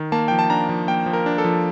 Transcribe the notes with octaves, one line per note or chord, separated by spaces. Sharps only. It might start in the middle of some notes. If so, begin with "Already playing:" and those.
Already playing: D#3
A#3 A5
F3 G5
A5
D4 A#5
F3
A#3 G5
F3
A#4
D4
A4
F3